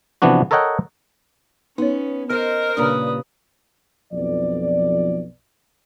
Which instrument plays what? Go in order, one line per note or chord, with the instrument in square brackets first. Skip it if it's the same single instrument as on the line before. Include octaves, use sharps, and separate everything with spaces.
[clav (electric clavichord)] C3 E3 F3 B3 D4 F#4
A4 A#4 C#5 D#5 F#5 G5
[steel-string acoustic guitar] B3 [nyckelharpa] C#4 [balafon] D#4 C#5
[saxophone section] A#4 [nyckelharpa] C5 [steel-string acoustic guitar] D#5
[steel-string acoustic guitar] G2 A#2 C#3 [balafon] D4 D5 A#5 [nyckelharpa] B4 D#6
[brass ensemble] B1 F2 F3 B4 D5